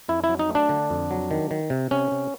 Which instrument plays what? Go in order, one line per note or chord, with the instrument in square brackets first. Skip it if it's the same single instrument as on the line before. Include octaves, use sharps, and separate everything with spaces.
[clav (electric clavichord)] F2 E4
E4
F#3
D#4
A3
D4
D3
F2
F#3
D#3
D#3
C3
C3 C#4
C3